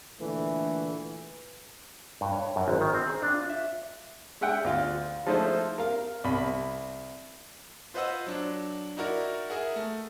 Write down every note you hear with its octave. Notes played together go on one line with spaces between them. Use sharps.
A#2 D3 E3 A3
G2
C#5
F#2
G#1
D#3
C4
G#4
D4
F4
E5
G#3 E5 F#5 G5
D2 F4 F5
F3 G#3 A3 D#4 E4 C5
A#4 F5
C2 B5
F4 B4 C5 D#5 F#5 E6
F#3 D4
D#4 E4 F#4 A#4 D5
G#4 A#4 E5 F#5
A3